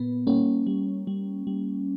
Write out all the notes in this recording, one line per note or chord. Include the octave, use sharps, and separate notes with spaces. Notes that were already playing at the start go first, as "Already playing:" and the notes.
Already playing: A#2 B3
G3 A#3 C#4
G3
G3
G3